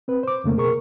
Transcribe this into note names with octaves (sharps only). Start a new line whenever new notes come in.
C4 B4
C5 D6
F2 C#3 A3 A#3
B2 G#4 A#4 C#6